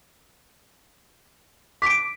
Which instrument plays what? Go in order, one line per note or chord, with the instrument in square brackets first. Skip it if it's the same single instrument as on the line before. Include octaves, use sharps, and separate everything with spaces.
[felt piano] D6 [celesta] B6 D7